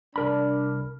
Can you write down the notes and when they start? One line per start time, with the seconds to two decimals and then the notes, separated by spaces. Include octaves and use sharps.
0.16 C2 D4 A#4 B5